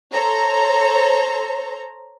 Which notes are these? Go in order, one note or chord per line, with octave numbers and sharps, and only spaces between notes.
A4 C5 C#5 A#5